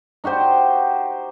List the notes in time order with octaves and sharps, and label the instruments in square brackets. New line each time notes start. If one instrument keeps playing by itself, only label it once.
[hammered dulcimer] D#4 F#4 G4 C5